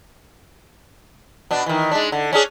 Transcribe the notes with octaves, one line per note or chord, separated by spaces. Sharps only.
B2 D4
D#3 E3
G#3 D4
D3
C#4 D4 G#4